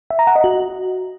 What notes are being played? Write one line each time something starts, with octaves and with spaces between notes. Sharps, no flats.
E5
A#5
F#5
D#5
F#4